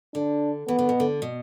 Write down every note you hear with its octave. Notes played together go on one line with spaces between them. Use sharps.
D3 D4
E3 B3
D3
B2
D3
B2